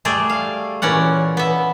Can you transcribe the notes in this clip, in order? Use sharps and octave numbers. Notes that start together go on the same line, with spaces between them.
G3 A3 G#4 D5
F5
A#2 E3 C#4 D5 F#5
B3 E5